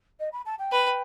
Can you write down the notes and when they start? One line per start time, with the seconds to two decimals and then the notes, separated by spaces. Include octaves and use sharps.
0.20 D#5
0.32 B5
0.46 A5
0.59 G5
0.72 B4